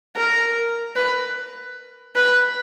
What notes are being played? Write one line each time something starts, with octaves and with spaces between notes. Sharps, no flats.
A#4
B4
B4